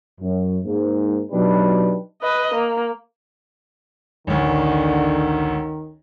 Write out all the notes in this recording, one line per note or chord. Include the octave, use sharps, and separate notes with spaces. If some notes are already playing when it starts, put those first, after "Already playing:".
F#2
G#2 A#3
B2 F#3 D4 D#4 G4 B4
B4 D#5
A#3
A1 D2 D3 D#3